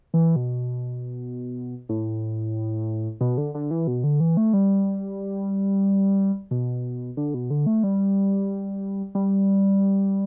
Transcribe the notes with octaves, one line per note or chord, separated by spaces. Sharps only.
E3
B2
A2
B2
D3
D3
E3
B2
D3
E3
A3
G3
B2
D3
B2
D3
A3
G3
G3